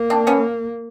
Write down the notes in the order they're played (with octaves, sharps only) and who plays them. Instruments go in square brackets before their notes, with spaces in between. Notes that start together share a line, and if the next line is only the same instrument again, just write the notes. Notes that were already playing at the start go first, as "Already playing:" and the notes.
Already playing: [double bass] A#3
[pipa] C4 D4
B3 C#4